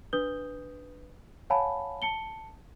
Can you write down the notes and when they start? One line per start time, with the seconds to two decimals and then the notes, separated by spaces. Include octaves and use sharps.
0.13 D4 B4 D#6 G6 G7
1.50 C#5 F5 F#5 G#5 A5 B5
2.02 A5 C#7 G7